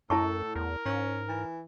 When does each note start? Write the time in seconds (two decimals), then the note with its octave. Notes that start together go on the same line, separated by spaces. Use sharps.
0.10 F#2 A2 E4 A4 A5 C#6
0.55 E2 A#4
0.86 G#2 C#4
1.28 E3